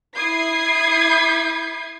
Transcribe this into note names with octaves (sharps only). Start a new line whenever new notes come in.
E4 B5 D#6 G#6 C7